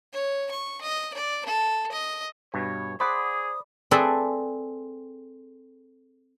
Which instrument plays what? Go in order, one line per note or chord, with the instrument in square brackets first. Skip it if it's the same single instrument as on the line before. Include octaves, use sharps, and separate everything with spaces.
[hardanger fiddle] C#5
C#6
D#5
D5
A4
D#5
[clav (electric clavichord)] G2 B2 [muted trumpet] C#5
[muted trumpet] G#4 [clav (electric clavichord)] C5 F#5 [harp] D5 B5 [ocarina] D#6
[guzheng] C4 G#4 A4 B4 D5 E5